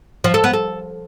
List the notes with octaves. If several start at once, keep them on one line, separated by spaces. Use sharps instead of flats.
F3
A4
B3
A4